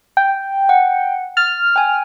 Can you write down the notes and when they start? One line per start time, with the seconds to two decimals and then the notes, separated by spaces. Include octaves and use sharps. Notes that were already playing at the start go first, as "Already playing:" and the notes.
0.17 G5
0.69 F#5
1.37 F6 A6
1.76 G5 G#5